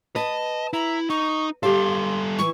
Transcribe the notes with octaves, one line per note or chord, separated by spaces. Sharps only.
B4 D#5 A5
E4 A#5
D#4 C#6
G3 G4 A4 F5 C6
E3 E4 C#6